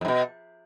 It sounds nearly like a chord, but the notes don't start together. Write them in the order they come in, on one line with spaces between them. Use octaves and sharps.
F2 G#2 B2